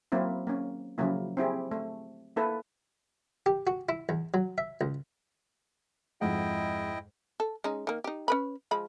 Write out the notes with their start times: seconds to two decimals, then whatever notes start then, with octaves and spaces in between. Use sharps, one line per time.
0.12 F#3 A#3 C4 E4
0.47 A#3 C#4
0.98 C#3 F3 F#3 A#3 E4
1.37 C4 E4 G4 G#4
1.71 A3
2.36 A#3 E4 A4 B4
3.46 G4
3.67 F#4
3.89 E4
4.09 E2
4.34 F#3
4.58 E5
4.81 C#2
6.21 F2 G#2 E4 D#5 F#5 G5
7.40 A4
7.64 G#3 C#4 D#4
7.87 D#3 A#3
8.04 D#4 G4
8.28 C#4 B4 B5
8.71 F3 G#3 B5